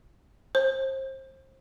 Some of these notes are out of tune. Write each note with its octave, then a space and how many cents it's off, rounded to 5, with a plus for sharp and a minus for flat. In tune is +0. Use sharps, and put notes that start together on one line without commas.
C5 +30